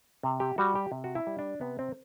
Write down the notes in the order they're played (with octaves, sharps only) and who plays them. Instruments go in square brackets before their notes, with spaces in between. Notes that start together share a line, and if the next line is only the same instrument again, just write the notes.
[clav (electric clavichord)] C3
G4
G3 F#4
G4
C3
F#4
E4
G3
D4
C3 B3
C4